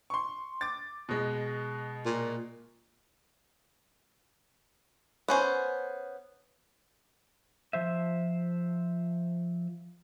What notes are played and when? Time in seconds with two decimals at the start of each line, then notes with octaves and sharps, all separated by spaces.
0.10 C6 C#6
0.61 D6 A6
1.09 B2 G#3
2.06 A#2
5.28 B3 C#4 C5
7.73 F3 C5 E5